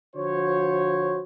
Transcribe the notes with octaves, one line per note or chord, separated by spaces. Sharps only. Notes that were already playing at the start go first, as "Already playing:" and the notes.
D3 F3 F#4 C5 C#5